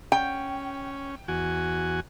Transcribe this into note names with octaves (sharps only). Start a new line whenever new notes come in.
C#4 G5
E2 F#4 G#5